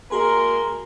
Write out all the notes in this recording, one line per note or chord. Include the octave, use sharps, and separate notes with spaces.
G#3 A#3 F#4 G#4 A#4 G#5 C6